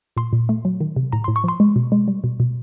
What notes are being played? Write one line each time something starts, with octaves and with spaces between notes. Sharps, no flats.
A#2 C6
A#2
A3
F#3
D#3
C3
A2 A#5
A2 C6
C#6
F3 C6
G#3
B2
G#3
G3
B2
B2